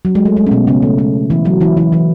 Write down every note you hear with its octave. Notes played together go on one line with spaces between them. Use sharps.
F#3
G#3
A3
G#3
C#4
B2 B3
C#3 C#4
A3
A3
E3 E4
F#3 F#4
E3 E4
E3 E4
E3 E4